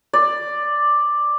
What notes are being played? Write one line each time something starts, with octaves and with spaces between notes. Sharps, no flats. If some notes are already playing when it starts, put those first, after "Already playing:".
D5